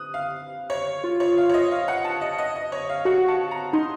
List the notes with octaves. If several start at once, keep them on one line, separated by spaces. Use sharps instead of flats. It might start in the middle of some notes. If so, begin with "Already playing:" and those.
Already playing: D#6 F#6
F5
C#5
F4
C#5
F5
C#5
D#5
F5
F#5
A5
D#5
D#5
D#5
C#5
F5
F#4 F#5
A5
A#5
D#4 C6